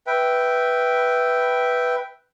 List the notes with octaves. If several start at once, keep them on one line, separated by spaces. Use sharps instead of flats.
B4 E5 G5